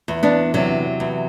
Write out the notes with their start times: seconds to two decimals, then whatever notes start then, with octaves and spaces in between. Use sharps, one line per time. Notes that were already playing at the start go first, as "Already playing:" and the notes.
0.08 E2
0.23 B3 D4
0.54 C3 F#3
1.00 E2